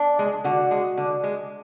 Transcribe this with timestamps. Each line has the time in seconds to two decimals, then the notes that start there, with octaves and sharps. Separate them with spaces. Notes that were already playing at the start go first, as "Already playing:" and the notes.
Already playing: D4
0.19 G#3
0.44 D3 F#4
0.71 G#3
0.97 D3
1.24 G#3